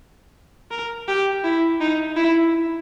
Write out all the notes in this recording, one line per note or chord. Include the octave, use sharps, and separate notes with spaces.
A#4
G4
E4
D#4
E4